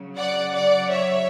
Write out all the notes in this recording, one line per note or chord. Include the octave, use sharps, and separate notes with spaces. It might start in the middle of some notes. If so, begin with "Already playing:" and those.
Already playing: C#3 F#3
D5 F#5
D5 F#5
C#5 E5